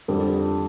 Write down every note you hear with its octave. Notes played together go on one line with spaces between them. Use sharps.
F2 D3 G3